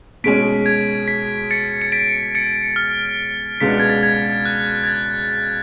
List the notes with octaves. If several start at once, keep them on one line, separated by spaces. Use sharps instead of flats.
B2 G#3 C#4 G#4 B6 D7
G#6
B6
A6 C#7
C#7
B6 D7
A6 C#7
F6
C#2 B2 G#3 B3 D4 B6
A6
G#6
A6
G#6
F#6
G#6
A6